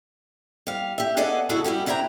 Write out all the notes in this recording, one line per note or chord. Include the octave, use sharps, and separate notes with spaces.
G3 F5
G4 E5
B3 G#4 A4 D5 D#5 F#5
C#3 F#3 E4 F#4 G#4 A4
G3 E4 F#4 G4
C3 D4 E4 E5 G5 A#5